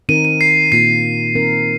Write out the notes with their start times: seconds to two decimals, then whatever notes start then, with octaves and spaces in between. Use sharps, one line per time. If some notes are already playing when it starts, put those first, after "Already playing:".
0.09 D#3 C4 D#4 A#4 D#7
0.25 D#7
0.41 C7
0.72 A#2 A#3 F4 C7
1.35 D#3 C4 D#4 A#4